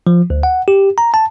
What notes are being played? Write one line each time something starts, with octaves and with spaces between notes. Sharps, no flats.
F3
D2
F#5
G4
A#5
A5